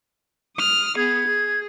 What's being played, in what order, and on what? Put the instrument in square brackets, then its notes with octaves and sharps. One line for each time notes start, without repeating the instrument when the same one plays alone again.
[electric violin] D#6 F6
[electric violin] B3 G#4 [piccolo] G#6
[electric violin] G#4